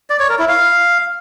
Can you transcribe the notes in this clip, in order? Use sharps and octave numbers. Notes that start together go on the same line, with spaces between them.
D5
C#5
A#4
E4
F5